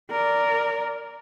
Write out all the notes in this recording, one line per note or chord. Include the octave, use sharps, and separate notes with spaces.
A#4 D5